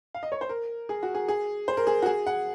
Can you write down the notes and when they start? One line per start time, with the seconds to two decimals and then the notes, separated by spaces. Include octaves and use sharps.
0.15 F5
0.23 D#5
0.32 C#5
0.41 C5
0.49 A#4
0.89 G#4
1.03 F#4
1.15 G#4
1.28 G#4
1.68 C5
1.77 A#4
1.87 G#4
2.02 F#4
2.06 G#4
2.27 F#5